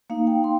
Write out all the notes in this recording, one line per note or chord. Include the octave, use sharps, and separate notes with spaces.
A#3 D#4 F5
G5
C6